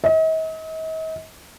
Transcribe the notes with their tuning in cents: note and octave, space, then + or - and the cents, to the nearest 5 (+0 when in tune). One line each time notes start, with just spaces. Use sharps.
D#5 +45